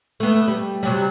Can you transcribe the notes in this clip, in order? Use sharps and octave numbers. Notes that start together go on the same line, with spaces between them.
A3 B3
G3
C3 F#3 G3